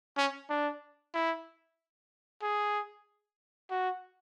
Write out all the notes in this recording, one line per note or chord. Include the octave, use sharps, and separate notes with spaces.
C#4
D4
E4
G#4
F#4